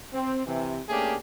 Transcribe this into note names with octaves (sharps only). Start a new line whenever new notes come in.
C4
C3 E3
A3 A#3 C#4 D4 G4 G#4